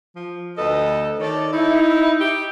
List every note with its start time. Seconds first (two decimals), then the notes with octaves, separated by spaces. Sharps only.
0.16 F3
0.57 D2 A4 B4 D#5
1.19 D#3 A4 C#5 D5
1.53 D#4 E4
2.20 G4